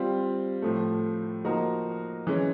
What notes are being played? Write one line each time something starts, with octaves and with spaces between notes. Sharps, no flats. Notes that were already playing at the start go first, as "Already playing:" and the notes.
Already playing: G3 C4 F4
A2 F3 A3
F3 A#3 D#4 F#4 A#4
E3 G#3 C#4